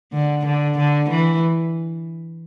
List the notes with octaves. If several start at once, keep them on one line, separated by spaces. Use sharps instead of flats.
D3
D3
D3
E3